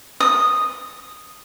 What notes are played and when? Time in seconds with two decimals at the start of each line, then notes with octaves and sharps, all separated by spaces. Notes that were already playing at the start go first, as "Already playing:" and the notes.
0.20 D#6